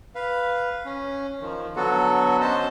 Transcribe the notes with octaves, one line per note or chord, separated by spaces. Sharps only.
B4 F5
C#4
D#3 F3
D3 F#3 B3 F#4 A4
C#4 C5 D#5 A5